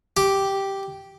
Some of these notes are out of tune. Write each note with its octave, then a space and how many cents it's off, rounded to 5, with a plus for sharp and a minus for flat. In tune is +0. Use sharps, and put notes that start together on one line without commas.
G4 -5